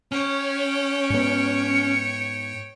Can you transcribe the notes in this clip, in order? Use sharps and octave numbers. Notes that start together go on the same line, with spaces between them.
C#4 C#5 G5
G#2 B3 C#7